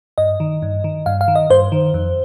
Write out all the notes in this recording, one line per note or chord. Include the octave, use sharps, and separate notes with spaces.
G2 D#5
D#3
G2
D#3
G2 F5
F5
D#3
D#5
G2 C5
D#3
F2